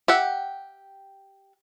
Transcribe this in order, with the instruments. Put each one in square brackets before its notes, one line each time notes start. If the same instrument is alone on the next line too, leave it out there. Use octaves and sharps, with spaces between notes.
[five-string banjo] G4 E5 F#5